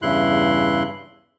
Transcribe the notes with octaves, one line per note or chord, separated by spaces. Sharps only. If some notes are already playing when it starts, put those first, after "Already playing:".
E2 G2 C#3 E4 C6 F#6